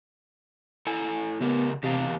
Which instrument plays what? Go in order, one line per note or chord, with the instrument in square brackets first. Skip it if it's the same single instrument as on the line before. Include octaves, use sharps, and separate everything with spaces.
[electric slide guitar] E4 A4 G#5
[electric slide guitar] C#3 G4 A#4 [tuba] B3
[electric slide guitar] E2 G4 F5 [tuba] C3